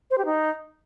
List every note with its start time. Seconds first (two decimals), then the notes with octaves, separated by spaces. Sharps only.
0.11 C5
0.18 G4
0.25 D#4